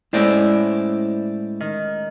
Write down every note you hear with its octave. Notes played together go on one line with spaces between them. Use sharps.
A2 G#3 C#4 E4 C5 D5
D#3